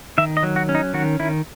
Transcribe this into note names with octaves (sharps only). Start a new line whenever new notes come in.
D#3 E5
D#5
F#3
F#4
C#4
D#4
D#3 F#4
D#3 E4